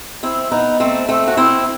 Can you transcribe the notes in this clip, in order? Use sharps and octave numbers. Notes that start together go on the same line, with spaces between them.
C4 E4
B3 D#4
A3 C4
A3 C4
F#4
C4 E4